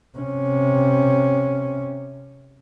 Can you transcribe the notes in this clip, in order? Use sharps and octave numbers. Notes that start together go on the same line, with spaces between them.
C3 C#4